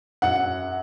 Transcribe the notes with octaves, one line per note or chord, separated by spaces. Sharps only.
F#2 F#5